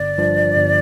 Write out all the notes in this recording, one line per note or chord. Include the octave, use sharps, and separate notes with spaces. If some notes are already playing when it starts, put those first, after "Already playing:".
Already playing: G1 D5
G2 F3
G1